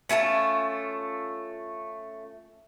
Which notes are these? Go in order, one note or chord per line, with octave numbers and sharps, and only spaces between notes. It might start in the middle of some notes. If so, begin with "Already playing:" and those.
A3 C#4 F4 A5